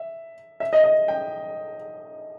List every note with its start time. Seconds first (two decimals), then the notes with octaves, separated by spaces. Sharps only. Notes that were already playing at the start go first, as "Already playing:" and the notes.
Already playing: E5
0.60 E5
0.73 D#5
0.84 D#5
1.08 G5